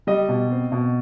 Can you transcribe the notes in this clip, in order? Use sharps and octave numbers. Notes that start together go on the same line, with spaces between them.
G3 D#5
B2
C4
B2